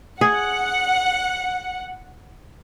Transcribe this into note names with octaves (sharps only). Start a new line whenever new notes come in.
G#4 F#5